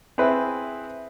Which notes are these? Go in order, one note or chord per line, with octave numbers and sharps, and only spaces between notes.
C4 E4 G#4 B4